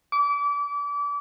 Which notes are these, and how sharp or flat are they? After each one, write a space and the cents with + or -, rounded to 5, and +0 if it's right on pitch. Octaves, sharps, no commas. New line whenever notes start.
D6 -30